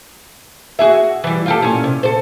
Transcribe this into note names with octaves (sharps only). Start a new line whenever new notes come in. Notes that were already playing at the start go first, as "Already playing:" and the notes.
F#4 G#4 E5
E3 G3
F4 G4 A4
A#2 C#4
C3
A4 C5